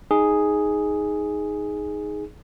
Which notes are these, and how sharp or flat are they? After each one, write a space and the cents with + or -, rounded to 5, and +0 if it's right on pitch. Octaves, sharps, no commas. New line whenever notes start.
D#4 +0 G#4 +0